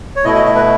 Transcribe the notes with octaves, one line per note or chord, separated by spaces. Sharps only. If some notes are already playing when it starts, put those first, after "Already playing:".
C#5
B2 A3 E4 D#5
D#5
D#5
B4